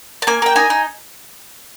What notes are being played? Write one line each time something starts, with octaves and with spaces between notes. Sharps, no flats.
A5
A#3 G#5
A#3 G5
D#4 G#5
D#4